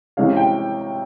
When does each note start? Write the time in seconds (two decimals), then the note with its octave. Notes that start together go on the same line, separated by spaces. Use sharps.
0.17 C3 E3 G#3 C#4 F5
0.36 G5